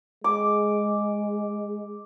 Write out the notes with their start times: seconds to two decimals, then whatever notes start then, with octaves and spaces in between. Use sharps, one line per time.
0.24 G#3 D6